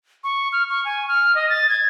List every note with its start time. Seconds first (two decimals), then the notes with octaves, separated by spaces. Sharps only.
0.24 C#6
0.52 F6
0.69 C#6
0.85 G#5
1.08 F6
1.35 D#5
1.50 A6
1.69 G#6